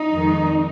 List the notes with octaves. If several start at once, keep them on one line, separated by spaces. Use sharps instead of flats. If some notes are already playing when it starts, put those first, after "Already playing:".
Already playing: D#4
F2 D#3 G#3